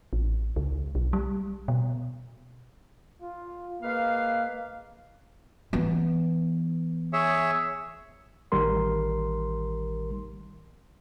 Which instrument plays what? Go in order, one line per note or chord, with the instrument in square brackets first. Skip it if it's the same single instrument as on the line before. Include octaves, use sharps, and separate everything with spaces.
[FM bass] A1
C#2
B1
G3
B2
[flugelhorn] F4
[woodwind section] G#3 B4 F5 [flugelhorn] A#3
[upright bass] E3 B3
[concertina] G#4 C#5 E5
[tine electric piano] A1 D#3 G3 A#4 C6